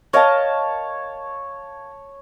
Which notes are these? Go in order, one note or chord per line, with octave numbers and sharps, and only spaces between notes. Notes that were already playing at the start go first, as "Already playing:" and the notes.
A#4 C#5 D#5 F5 A5